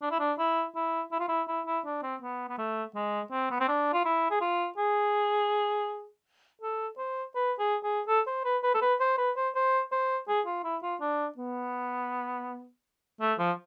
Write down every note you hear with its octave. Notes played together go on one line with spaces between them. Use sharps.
D4
E4
D4
E4
E4
E4
F4
E4
E4
E4
D4
C4
B3
B3
A3
G#3
C4
B3
C4
D4
F4
E4
G#4
F4
G#4
A4
C5
B4
G#4
G#4
A4
C5
B4
B4
A4
B4
C5
B4
C5
C5
C5
G#4
F4
E4
F4
D4
B3
A3
F3